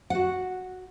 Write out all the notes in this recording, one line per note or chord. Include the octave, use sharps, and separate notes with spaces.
F#4 F#5